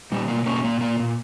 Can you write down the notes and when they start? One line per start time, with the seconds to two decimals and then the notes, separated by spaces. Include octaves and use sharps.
0.12 A#2 G3
0.28 B2 A#3
0.46 B2 A#3 C#4
0.64 A#2 A#3
0.81 A#2 A#3
1.00 A#2